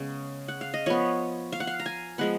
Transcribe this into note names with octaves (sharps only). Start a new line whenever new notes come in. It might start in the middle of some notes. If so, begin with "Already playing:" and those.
Already playing: C#3 G#3 B3
F#5
F5
D#5
F3 B3 C#5
F5
F#5
F5
A#5
G#5
F3 G#3 B3 F#5